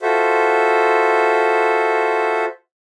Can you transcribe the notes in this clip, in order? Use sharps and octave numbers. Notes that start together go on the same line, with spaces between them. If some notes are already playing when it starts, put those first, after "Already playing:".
F4 F#4 A4 C5 E5